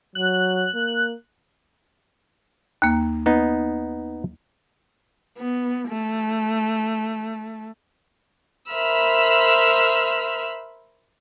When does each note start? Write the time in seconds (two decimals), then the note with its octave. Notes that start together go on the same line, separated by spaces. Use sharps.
0.15 F#3 F#6
0.75 A#3
2.82 D#2 A#3
3.26 B3 D#4
5.38 B3
5.88 A3
8.71 A#4 C5 E5 B5 E6 F6